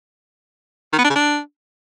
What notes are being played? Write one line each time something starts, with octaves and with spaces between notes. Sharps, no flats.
D#3
B3
D4
C#3
D4